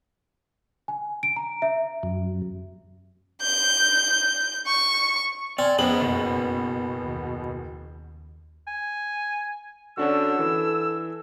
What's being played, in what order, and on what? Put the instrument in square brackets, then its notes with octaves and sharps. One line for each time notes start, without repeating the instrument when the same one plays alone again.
[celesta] G#5
D7
A#5
E5
[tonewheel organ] F#2
[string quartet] G6
C#6
[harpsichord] C4 [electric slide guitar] D5 [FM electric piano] G#5 F6
[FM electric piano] F2 C#4 [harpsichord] B3 [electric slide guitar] G#4 C5 [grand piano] F#7
[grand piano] F#1 [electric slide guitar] B2
[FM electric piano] D#2
[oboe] G#5
[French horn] D3 [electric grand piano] C#4 D4 F#4 [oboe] E6
[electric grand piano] E3 [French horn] A4